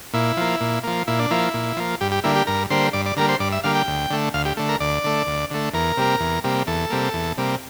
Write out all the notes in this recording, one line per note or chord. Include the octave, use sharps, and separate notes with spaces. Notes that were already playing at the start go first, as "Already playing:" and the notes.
A#2 E4
F3 A#3
A#2
F3 A#3
A#2 E4
D4
F3 A#3 E4
A#2
F3 A#3
G2 G4
G4
D3 G3 A#3 E4
G4
G2 A#4
D3 G3 A#3 C5
G2 D5
D5
D3 G3 A#3 A#4
C5
G2 D5
E5
D3 G3 A#3 F5
G5
D2
D3 A3
D2 F5
G4
D3 A3
A#4
D2 D5
D3 A3
D2
D3 A3
E2 A#4
C3 G3 A#3
E2
C3 G3 A#3
E2 A4
C3 G3 A#3
E2
C3 G3 A#3